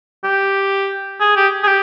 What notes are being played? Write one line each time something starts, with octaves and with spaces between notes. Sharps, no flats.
G4
G#4
G4
G#4
G4